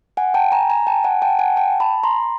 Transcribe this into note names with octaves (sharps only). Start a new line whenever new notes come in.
F#5 G#5
G5 A5
G#5 A#5
G#5 A#5
G5 A5
F#5 G#5
G5 A5
F#5 G#5
G5 A5
A5 B5
A#5 C6